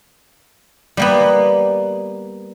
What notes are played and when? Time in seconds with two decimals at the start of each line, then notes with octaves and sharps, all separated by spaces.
0.97 G3 A#3 B3